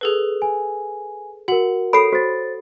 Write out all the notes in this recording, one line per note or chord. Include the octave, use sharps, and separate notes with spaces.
G#4 A4 B4
G#5
F#4 A#4 F#5 F#7
A4 C#5 B5 D#6 C7 D7
F#4 C5 A6